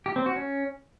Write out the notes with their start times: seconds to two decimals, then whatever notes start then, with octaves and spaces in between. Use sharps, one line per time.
0.06 G4
0.16 C4
0.26 F#4
0.36 C#4